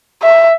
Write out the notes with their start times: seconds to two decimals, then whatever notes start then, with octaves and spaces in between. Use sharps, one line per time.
0.23 E5